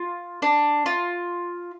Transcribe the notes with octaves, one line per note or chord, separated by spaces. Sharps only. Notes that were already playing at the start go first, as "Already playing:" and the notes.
Already playing: F4
D4
F4